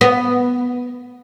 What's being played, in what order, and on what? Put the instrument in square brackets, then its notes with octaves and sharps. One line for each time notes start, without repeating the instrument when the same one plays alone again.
[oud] B3